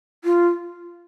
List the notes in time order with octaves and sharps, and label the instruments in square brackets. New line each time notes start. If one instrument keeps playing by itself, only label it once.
[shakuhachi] F4